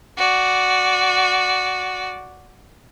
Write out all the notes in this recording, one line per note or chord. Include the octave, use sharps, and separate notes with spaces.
F#4 D5